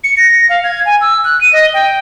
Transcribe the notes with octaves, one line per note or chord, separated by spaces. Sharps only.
C#7
A#6
F5
G#6
G#5
E6
F#6
D#7
D#5
G5